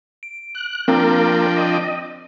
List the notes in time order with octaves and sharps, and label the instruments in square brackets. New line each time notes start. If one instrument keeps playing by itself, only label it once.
[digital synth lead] D7
[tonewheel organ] F#6
[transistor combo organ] F3 D4 G5 [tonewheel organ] A#3 A#4 [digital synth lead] C4
[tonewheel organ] D#5